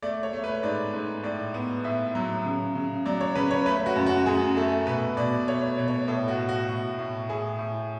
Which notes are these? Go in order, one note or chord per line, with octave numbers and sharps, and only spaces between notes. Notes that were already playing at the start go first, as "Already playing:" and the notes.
A3 D5
C#5
A3
B4
G#2 D5
G#2
A2 D5
B3
A2 E5
F#3
C#3
C#3
F#3 D5
C#5
C#3 B4
C#5
A3 B4
F#4
F#2
F#4
F#2 G#4
A3 A4
B2 B4
B2 D5
A3 C#5
B2
C#5
A2 A4
F#4
A2
F#4
A2
A2
A2 G#4
A2